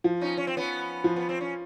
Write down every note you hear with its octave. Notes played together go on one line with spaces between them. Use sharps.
F3
C#4 D#4
C#4
C4
B3 C#4
F3
B3
C4
C#4